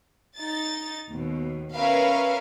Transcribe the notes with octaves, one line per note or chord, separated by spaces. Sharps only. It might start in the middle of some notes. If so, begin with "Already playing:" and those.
D#4 A6
D#2 B2
C#4 A#4 B4 E5 F5